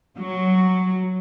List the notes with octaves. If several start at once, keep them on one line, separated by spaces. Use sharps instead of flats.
F#3